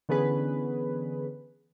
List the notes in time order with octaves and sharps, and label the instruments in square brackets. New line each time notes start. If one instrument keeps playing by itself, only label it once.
[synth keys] D3 E3 B3 C#4 G#4 B4